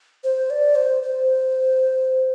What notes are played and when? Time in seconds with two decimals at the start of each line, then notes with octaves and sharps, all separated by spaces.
0.24 C5
0.50 D5
0.75 C5
1.03 C5